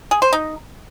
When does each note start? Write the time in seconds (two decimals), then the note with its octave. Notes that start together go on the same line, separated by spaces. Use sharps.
0.11 G#4
0.22 C5
0.33 D#4